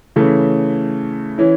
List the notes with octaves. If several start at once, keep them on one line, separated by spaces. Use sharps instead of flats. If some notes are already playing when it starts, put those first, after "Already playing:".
C#3 E3 A3 C#4
E3 C#4 E4